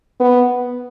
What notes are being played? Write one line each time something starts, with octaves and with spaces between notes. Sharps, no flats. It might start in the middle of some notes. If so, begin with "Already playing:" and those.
B3